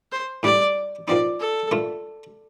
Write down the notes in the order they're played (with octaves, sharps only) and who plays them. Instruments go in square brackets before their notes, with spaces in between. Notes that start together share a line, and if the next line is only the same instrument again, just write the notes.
[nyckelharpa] C5
[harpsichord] A2 G3 D4 [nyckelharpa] D5
[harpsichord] A#2 F3 C4 D#4 [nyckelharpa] D5
[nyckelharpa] A4
[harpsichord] A#2 A3 D4 F4